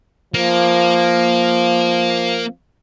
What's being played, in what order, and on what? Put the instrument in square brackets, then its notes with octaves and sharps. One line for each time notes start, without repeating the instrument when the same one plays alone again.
[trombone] F3 [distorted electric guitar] A#3